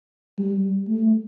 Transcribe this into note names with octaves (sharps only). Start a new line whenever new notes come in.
G3
A3